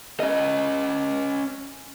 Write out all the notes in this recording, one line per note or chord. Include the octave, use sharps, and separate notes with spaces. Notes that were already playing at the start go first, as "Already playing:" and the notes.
C#4 D#5